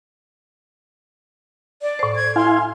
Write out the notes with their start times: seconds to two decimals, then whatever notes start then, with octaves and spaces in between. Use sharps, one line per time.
1.82 D5
1.99 A2 C5
2.16 G#6
2.36 E4 F5 G#5 C6